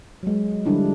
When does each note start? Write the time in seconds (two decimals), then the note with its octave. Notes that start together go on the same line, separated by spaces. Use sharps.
0.23 F#3 G#3
0.66 D3 F3 G3 D4 E4